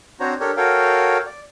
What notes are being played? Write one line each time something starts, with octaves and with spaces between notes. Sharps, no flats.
C4 D4 F#4 C5 C#5 A#5
D4 G4 A4 A#4 C#5
F#4 A4 A#4 C#5 F5 G5
D5